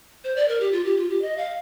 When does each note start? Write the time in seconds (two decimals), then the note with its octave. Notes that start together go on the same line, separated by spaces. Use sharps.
0.24 C5
0.36 D5
0.48 A#4
0.60 G4
0.72 F4
0.84 G4
0.97 F4
1.09 G4
1.22 D#5
1.37 F5